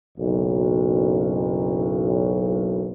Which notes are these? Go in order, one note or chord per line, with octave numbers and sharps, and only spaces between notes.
F#1 B1